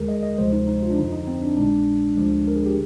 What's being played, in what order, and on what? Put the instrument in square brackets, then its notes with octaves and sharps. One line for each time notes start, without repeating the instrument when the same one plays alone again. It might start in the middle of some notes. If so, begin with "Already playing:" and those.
Already playing: [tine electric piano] D#2 D3 G#3 G#4 A#4
D#5
D#5
D2 C3 F3 G#3 C5
D#4
D#4
F4
D4
F2 D3 F3 D#4
D#4
C4
D4
A#1 A#2 G#3 D4
D2 D3 F3 G#3
A#4
G#4
G4